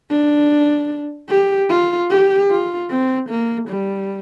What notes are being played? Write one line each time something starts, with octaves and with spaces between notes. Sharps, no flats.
D4
G4
F4
G4
F4
C4
A#3
G3